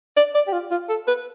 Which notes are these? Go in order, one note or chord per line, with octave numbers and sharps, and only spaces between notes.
D5
D5
G4
F4
F4
A4
B4